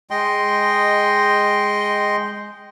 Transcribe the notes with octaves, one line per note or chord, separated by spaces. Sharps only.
G#3 D#5 G5 C6